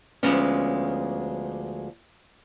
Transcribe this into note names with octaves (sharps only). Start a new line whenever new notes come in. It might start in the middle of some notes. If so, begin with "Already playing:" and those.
D2 F3 G#3 B3 C#4